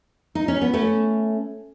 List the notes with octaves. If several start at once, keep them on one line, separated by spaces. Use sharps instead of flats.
D#4
C#4
B3
A3 C#4